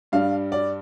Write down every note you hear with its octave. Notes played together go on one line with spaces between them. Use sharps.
G2 G3 D4 F5
D5